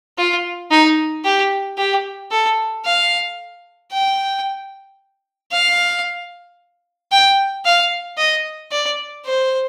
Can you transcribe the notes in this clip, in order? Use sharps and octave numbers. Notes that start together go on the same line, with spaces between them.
F4
D#4
G4
G4
A4
F5
G5
F5
G5
F5
D#5
D5
C5